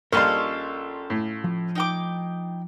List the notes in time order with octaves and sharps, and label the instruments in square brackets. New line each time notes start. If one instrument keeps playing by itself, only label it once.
[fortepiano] A#1 G3 C6 [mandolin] C#4 F4 A4 [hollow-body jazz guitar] A#4 D#5
[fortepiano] A2
[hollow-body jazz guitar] F3
[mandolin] D#4 G5 D6